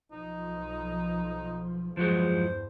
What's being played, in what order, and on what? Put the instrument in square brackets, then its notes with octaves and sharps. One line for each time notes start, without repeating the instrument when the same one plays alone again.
[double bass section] B1 F3 [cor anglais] D#4
[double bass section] E2 G2 [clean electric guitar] F3 F#3 G#3 [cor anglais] C5